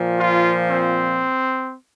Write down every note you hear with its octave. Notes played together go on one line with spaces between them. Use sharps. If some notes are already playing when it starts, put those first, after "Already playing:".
Already playing: A#2 F3
F4
C4